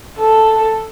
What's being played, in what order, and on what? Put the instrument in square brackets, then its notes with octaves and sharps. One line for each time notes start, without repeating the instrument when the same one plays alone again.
[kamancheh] A4